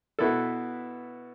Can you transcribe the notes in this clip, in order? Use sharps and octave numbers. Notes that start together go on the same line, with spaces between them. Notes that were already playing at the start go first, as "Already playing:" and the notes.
B2 B3 E4 A4